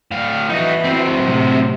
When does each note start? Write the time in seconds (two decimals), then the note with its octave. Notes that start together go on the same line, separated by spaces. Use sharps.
0.11 A2 F5
0.49 E3 D#4 F#4
0.85 F#3 C4
1.22 A2 C3